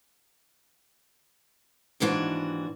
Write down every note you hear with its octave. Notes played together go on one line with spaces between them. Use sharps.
D#2 G#2 E3 D4 F#4